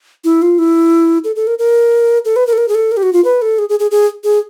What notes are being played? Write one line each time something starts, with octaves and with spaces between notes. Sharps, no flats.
E4
F4
E4
A4
A4
A#4
A#4
A4
B4
A#4
A4
A#4
G#4
A4
A#4
G4
F#4
F4
B4
A4
G#4
G#4
G#4
G#4
G#4